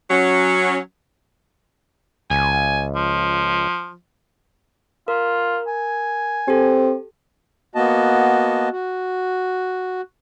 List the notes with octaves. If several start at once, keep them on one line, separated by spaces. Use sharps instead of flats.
F#3 C#4
C#2 G#5
F3
F4 A#4
G#5
C4 G4 A4
A#3 B3 F#4 D#5 A5
F#4